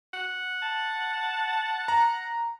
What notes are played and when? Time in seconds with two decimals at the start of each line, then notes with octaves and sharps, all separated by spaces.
0.14 F#5
0.62 A5
1.88 A#5